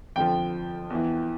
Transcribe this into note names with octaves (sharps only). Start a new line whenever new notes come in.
F2 D3 F3 G5
E2 E3